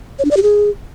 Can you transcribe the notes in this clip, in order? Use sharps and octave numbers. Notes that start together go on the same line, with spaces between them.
C#5
D4
D5
G4
G#4